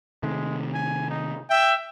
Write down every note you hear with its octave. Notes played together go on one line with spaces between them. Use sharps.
C3 D#3 G#3 A3
G#5
D#4
E5 G5